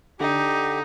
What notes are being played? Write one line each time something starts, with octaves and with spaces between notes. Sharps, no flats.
D3 D#4 G4